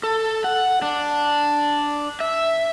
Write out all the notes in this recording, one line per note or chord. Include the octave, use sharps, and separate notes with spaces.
A4
F#5
D4
E5